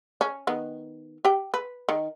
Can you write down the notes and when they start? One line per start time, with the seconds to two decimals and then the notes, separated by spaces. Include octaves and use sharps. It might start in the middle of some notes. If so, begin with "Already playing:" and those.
0.21 C#4
0.47 D#3 B3
1.25 G4 G5
1.54 B4
1.89 D#3